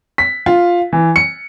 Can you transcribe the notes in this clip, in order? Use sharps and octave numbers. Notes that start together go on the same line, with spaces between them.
B6
F4
E3
C#7